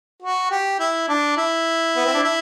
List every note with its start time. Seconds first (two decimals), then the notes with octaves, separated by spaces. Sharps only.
0.23 F#4
0.51 G4
0.80 E4
1.08 D4
1.37 E4
1.96 B3
2.05 C4
2.14 D4
2.23 E4